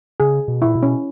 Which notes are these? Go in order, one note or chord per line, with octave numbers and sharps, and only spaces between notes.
C#3 G#4
B2
A#2 E4
B2
C#4